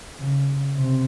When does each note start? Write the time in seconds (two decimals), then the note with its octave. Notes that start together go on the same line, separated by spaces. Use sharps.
0.18 C#3
0.77 C3